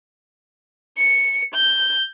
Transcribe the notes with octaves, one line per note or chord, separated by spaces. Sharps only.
C#7
G6